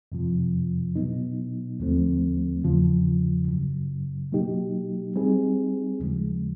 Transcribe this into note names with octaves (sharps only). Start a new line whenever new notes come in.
F2 C3 F3
B2 F#3 B3 D#4
D#2 D3 F3 A3 C4
E2 C#3 F3
F#2 C#3 F#3
B2 F#3 A#3 D#4 G4
G3 C4 D#4 G#4
D#2 C#3 F3 G#3